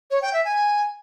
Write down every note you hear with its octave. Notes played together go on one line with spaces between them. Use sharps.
C#5
G5
E5
G#5